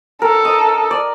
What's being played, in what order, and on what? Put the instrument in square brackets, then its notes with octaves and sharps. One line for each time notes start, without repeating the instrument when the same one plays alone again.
[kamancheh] A4 [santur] A#4
[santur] D#5
D5